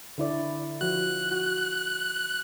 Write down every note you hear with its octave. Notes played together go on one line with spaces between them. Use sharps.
D3 E4 D5
F3 F#4 F#6
F#4